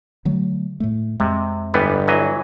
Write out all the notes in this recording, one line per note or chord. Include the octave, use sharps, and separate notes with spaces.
D3 F#3 A3
A2 A3
F2 C3 G#3
G1 E3 G3 B3
E3 F#3 D#5